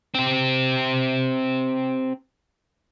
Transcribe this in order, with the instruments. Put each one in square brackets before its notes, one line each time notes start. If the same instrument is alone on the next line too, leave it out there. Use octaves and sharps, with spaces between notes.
[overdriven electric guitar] C4 G4